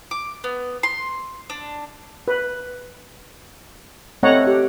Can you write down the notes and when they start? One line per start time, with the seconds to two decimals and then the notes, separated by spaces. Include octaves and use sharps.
0.11 D6
0.44 B3
0.83 C6
1.50 D4
2.28 B4
4.23 A3 C4 C#5 D#5 F#5 A#5
4.47 G4